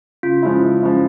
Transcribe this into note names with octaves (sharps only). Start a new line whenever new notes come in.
C#3 F4
F3 G#3 C#4 E4
C#3
F3 G#3 C#4 E4